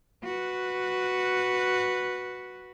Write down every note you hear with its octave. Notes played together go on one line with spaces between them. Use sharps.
F#4 B4